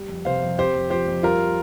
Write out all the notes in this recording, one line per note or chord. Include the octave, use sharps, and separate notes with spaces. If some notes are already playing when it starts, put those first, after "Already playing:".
Already playing: G3
F2
C3 C5 F5
F2
C4 G4 C5
F2
F3 G4 C5
F2
G3 F4 A#4